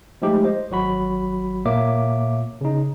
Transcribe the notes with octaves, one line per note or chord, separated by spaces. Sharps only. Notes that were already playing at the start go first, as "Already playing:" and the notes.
F3 G#3 A3 D#4 G4
C5 D#5
G#1 F#3 F#4 B5
A#2 A#3 C#5 E5 D6
C#3 D#4